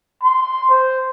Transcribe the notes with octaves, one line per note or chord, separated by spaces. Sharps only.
C6
C5